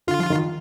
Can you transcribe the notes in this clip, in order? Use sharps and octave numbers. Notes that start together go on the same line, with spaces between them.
D3 F4
F3
D#3